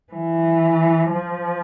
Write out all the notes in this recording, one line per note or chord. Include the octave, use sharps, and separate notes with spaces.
E3
F3